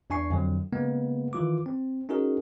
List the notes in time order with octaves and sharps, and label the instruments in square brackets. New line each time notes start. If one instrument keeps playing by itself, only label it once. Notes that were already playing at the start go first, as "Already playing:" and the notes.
[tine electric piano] E2 D4 G#5 C#6 C7
F2 D3 F#3
C#3 G#3 A#3 B3
D#3 E3 F4 D6
C4
C#4 D#4 F#4 G#4 A#4